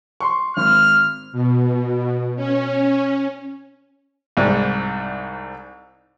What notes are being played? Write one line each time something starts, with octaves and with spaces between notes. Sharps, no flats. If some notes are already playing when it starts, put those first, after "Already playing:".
C6 C#6
G#1 F6
B2
C#4
C2 G#2 G3